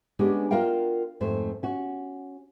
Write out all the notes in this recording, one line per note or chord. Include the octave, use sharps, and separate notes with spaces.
G#3 B3 C#4 D4 G4
F4 F#4 A#4 D5 F5 G5
F2 G#2 A3 C5
C#4 F#4